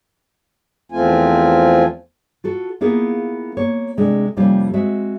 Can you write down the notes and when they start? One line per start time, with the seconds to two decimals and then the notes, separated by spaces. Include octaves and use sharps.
0.92 E2 F3 A3 C4 F4 G#5
2.44 F4 F#4 A4
2.81 A#3 B3 E4 F4 G#4 A#4
3.57 A#3 C#5
3.97 C3 G#3 A3 D4
4.37 F2 C3 G3 A#3 C#4 F4
4.73 G#3 C4 F#4 E5